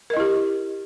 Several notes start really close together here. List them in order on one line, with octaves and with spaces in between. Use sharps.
A#4 D#5 E4 G4